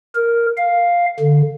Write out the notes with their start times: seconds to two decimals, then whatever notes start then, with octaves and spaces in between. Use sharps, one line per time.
0.15 A#4
0.58 F5
1.20 D3